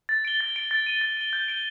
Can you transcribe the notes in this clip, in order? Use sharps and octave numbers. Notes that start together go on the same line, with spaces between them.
A6
D7 G7
A6
D7 G7
A6
D#7 G7
A6
D#7 G7
G6
D7 G7